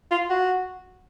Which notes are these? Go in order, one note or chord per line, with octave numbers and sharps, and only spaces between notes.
F4
F#4